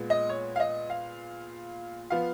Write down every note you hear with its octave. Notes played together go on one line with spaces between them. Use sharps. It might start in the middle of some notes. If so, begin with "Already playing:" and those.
Already playing: A#2 G#3 B3
D#5
C#5
F5
D#5
F5
F3 B3 F5